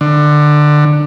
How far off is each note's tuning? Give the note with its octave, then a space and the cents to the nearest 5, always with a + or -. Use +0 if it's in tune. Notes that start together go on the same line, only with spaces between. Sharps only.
D3 +20